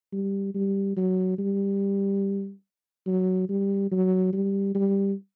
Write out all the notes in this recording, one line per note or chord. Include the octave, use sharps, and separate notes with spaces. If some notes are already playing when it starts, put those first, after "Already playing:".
G3
G3
F#3
G3
F#3
G3
F#3
G3
G3